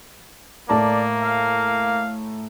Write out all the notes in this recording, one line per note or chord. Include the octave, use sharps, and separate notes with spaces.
A2 A#3 D5 A5 A#5
F5